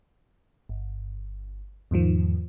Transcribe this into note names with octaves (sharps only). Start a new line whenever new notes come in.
G1
E2 G#2 D#3 F3